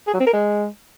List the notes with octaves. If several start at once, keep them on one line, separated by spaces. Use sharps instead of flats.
G#4
F#3
C4
A#4
G#3